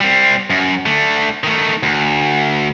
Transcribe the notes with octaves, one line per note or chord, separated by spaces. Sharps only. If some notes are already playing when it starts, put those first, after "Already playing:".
G3 C4
F#2
D3 A3
D#3 A3
D2